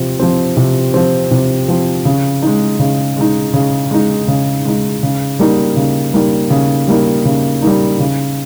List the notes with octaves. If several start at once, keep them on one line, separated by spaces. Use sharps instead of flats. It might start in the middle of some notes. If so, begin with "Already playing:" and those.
Already playing: C3 F3 C4
F3 C4
C3
F3 C4
C3
F3 C4
C#3
G#3 D#4
C#3
G#3 D#4
C#3
G#3 D#4
C#3
G#3 D#4
C#3
G3 A#3 D#4
C#3
G3 A#3 D#4
C#3
G3 A#3 D#4
C#3
G3 A#3 D#4
C#3